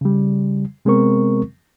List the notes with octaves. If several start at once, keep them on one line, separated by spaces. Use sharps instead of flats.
C#3 G3
C3 G#3 B3 C4 A#4 C#6